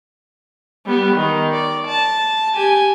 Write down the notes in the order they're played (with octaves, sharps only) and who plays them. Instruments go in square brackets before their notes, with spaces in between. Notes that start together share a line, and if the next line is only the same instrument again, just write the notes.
[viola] G3 B3
D#3
D5
A5
G4 G#5